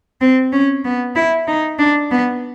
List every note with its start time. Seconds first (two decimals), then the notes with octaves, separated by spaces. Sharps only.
0.21 C4
0.53 C#4
0.85 B3
1.16 E4
1.47 D#4
1.79 D4
2.11 B3